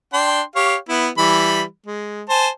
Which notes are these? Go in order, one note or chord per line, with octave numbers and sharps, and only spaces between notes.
D4 G5 C6
G4 C#5 F5
B3 E4
E3 G3 B5
G#3
C5 G#5 A5